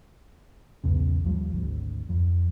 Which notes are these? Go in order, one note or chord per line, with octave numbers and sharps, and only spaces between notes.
B1 E2 G#2 C#3
D#2 F3 G3
G#1 D2
F2